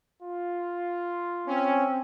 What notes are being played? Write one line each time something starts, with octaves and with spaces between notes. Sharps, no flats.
F4
C4 C#4